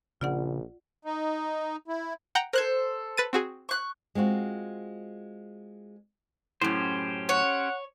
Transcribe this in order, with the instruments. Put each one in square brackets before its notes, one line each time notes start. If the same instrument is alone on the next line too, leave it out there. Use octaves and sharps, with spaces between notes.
[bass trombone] A#1 [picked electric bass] C#3 [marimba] F4 D5 F#5
[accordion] D#4
E4
[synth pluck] F#5 G5 A#5
[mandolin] A4 C5 [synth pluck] A#4 F#6 G#6
[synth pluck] B4 A6 D#7
C4 F#4 G#4
[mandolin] C#6 F#6
[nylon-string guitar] G#3 C4 F4 F#4
[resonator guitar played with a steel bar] F#2 A2 [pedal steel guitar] C#4 G4 C5
[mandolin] C#5 [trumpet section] F#5